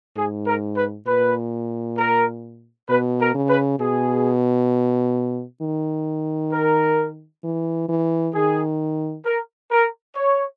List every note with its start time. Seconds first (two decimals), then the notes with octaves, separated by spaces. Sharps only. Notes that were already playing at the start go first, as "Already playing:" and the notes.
0.16 G#2 G#4
0.47 A#4
0.77 B4
1.07 A#2 B4
1.98 A#4
2.89 B2 B4
3.19 A#4
3.35 C#3
3.49 B4
3.79 B2 G#4
5.62 D#3
6.52 A#4
7.44 E3
7.89 E3
8.34 D#3 G#4
9.25 A#4
9.71 A#4
10.16 C#5